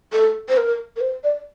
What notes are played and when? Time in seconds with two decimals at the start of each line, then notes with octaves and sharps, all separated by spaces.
0.13 A4
0.49 C5
0.57 A#4
0.96 A#4
1.01 C5
1.24 D5